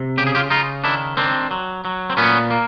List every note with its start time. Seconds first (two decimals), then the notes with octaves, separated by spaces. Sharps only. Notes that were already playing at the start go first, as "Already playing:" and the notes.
Already playing: C3
0.17 C#3 G4
0.27 G#4
0.35 F4 G4
0.50 C#3 D#4 F4
0.84 D#3 D4 E4
1.17 D#3 C4 D4
1.51 F#3
1.85 F#3
2.10 C4
2.17 A#2 B3 C#4
2.50 A#3